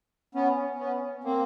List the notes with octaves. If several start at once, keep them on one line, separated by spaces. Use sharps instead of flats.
B3 C#4
B3 C#4
A#3 C4